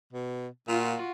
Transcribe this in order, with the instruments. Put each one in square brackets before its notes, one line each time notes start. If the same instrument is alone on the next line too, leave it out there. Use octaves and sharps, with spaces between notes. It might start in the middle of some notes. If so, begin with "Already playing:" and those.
[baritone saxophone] B2
[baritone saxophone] A#2 [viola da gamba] F4 F#4